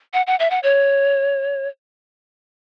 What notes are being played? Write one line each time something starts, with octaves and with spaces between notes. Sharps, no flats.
F#5
F#5
E5
F#5
C#5